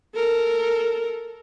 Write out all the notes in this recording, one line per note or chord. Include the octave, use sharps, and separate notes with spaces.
A4 A#4